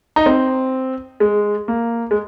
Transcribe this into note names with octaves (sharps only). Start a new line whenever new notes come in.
D#4
C4
G#3
A#3
G#3